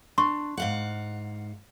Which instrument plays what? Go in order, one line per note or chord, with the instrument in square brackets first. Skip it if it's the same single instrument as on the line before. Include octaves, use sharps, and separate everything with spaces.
[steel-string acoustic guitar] D4 [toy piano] C6 C#6
[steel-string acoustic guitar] G#2 F5 F#5